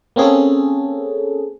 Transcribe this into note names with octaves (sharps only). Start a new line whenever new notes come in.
A#3 C4 C#4 G#4 A4